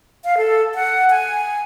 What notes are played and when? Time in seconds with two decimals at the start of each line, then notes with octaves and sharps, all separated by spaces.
0.25 F5
0.37 A4
0.75 F#5
1.10 G#5